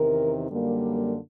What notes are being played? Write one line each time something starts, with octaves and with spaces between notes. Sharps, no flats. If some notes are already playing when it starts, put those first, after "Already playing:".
Already playing: E2 C3 D#3 A#4
F#2 D3 G3 A#3